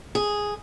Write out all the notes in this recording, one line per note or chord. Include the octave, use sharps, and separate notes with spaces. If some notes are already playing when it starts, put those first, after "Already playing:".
G#4